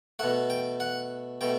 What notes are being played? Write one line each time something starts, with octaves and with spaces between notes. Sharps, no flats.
B2 A3 F#5
G5
F#5
B2 A3 G5